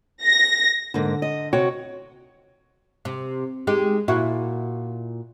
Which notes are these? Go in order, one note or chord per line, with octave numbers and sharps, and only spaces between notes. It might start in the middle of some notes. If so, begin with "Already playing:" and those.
A#6
G#2 D3 A#3
D#5
C3 F#4 C#5 G5
C3
G#3 D#4 G4
A#2 E4 F#4